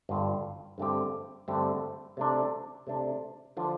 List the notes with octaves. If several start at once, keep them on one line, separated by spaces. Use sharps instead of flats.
G1 G2 G3 F4
G2 D3 A3 C4 G4
G2 D3 A3 C4 G4
C3 A3 D4
C3 A3 D4
D3 F3 D4 F4